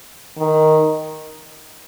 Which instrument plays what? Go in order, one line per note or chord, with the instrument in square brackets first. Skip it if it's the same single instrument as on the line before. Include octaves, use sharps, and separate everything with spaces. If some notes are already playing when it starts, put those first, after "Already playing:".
[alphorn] D#3